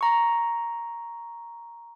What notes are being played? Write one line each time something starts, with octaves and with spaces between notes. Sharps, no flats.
A#5 C#6